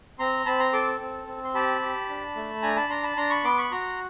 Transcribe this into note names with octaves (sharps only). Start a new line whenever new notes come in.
C4 A#5 C6
C4 A5 B5
A#5 C6
A4 C6 D6
C4
C4
C6
G4 A5 B5
G4
D4
A3
D4 G#5 A#5
A5 B5
D4 A#5 C6
A5 B5
D4 A#5 C6
B5 C#6
B3 C6 D6
B5 C#6
F#4 A#5 C6